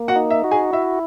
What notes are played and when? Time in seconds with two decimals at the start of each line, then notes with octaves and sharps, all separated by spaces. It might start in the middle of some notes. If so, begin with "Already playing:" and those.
Already playing: A#3
0.08 F#4 F#5
0.16 D#4
0.30 E5
0.44 F#4
0.51 G#4 G#5
0.73 E4 E5